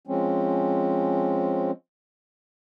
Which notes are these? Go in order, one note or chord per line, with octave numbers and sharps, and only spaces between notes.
F3 G#3 C4 C#4